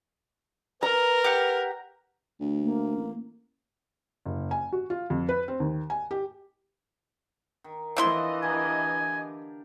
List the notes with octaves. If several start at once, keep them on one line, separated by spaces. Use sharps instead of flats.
A#4 B4 A#5
G4 F#5
D2
A#3
A1
F#1
G#5
F#4
F4
F2
B4
C4
D#2
G#5
G4
D#3
E3 F3 A3 C4 D4 E4 D#5 C6
D3 G4 A#4 G#5